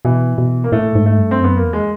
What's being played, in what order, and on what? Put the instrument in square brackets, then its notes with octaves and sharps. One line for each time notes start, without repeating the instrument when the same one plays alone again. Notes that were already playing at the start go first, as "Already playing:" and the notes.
[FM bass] B2 [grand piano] E3
[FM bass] B2
[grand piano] A#3
[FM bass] A2 [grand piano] A3
[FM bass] G#2
[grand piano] A3
[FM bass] G2
[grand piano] C4
[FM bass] F#2 [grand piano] B3
[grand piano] A#3
[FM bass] E2
[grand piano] G#3